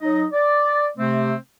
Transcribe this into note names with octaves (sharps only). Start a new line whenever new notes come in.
F#3 D#4 D#5
D5
C3 A3 C4